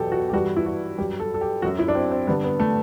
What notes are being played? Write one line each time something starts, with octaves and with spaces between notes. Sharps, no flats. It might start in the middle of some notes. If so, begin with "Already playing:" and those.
Already playing: E2 B2 F#3 G4 A4
F#4
G4
G2 E3 G3 F#4
E4
F#4
G2 F#3 G4
A4
A4
G4
F#2 F#3 F#4
E4
D4
C4
C4
G2 D3 G3 B3
B3
A3